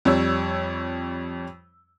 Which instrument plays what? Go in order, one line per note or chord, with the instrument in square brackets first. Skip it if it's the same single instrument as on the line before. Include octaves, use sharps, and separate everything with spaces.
[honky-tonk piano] F2 G3 C#5 E6